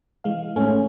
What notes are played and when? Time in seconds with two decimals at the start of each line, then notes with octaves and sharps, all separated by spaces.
0.24 E3 G#3 F5
0.56 A2 A3 C#4